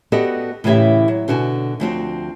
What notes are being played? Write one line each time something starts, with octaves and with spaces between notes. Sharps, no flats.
B3 F#4 G4 A4 D5 D#5
A2 C#3 E3 E4 G4 E5
F#3
B2 D3 F#4 G#5
D2 F3 C4 F#4